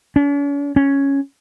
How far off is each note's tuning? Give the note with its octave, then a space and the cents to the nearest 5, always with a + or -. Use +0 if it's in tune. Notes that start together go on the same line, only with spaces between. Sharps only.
C#4 +45
C#4 +0